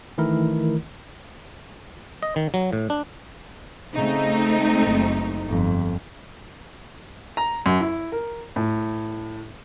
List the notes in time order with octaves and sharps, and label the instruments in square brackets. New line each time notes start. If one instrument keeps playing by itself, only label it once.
[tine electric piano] D#3 E3 A3 E4 A#4
[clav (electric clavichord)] D#5
D#3
F#3
A2
D4
[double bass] C#3 [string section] A3 C4 D#4
[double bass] F#1
G1 F2
[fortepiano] A#5
F#2
E4
A#4
A2